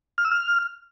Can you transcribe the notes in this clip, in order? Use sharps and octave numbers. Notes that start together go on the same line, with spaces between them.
F6
E6
F6